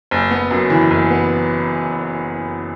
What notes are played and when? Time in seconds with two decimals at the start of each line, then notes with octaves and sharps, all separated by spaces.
0.11 F#1
0.31 B3
0.51 F#2
0.70 E3
0.90 F#1
1.10 B3